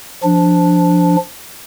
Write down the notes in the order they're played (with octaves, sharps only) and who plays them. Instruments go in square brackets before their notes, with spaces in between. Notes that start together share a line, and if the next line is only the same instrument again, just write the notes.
[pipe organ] F3 D4